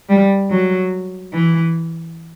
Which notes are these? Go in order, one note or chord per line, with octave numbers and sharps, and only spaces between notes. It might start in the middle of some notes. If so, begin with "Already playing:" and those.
G3
F#3
E3